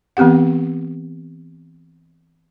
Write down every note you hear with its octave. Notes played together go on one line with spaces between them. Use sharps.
E3 B3 C4 G4 F#5